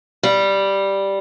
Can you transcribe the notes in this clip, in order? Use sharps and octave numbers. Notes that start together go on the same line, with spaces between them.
G3